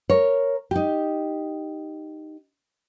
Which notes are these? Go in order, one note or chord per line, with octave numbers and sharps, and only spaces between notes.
A#4 C#5
D#4 G4